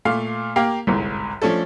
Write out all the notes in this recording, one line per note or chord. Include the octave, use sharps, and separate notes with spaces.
A#2 A3 F5
A#3 G4 F5
G1 C2 G#2
F3 A3 C#4 D4 A4